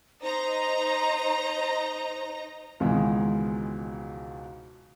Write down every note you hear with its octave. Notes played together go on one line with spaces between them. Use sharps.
D#4 C5 A#5
C#2 G#2 B2 D#3 E3 G#3